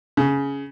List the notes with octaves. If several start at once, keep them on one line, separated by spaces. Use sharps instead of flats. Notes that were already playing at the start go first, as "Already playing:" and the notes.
C#3